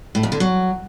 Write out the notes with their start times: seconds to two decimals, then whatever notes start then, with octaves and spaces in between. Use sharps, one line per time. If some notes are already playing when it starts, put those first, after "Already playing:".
0.15 A2
0.23 F2
0.32 D3
0.40 F#3